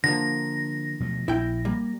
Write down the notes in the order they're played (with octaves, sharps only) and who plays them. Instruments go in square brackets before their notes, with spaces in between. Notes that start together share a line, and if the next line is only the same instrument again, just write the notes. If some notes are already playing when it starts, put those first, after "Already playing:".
[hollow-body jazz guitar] D3 F3 A#3 [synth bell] A#6
[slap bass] B2 F3 A3
[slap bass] A#1 [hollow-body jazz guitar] E4 G5
[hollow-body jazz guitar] G3 A#3